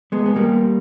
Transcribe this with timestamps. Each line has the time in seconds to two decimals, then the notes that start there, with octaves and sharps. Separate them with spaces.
0.12 G#3 B3
0.26 B3
0.36 G3 A#3